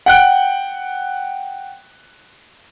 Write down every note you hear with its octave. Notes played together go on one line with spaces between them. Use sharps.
F#5 G5 F#6 D7